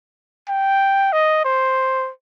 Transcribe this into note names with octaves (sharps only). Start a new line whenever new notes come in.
G5
D#5
C5